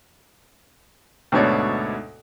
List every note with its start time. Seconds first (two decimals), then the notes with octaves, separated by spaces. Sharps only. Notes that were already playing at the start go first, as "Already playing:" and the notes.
1.32 D2 G#2 B2 C#5 D5